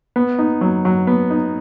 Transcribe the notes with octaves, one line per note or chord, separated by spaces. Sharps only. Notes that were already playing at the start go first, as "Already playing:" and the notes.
B3
D#4
F#3
F#3
B3
D#4